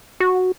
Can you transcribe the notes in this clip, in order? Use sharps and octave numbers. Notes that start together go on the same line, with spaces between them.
F#4